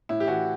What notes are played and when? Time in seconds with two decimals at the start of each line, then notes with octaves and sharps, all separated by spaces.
0.09 A2 E4
0.20 G4
0.28 E3 F#4